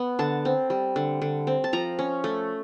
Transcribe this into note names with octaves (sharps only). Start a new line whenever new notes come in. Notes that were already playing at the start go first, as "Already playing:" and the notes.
Already playing: B3
D3 A5
C4
G3
D3
D3
C4
A5
F3 A#5
C#4
A3